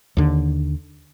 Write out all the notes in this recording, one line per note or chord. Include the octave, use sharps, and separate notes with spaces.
D#2 D3